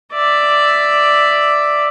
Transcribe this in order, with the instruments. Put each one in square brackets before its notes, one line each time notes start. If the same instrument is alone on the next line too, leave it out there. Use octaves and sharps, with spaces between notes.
[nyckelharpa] D5 E5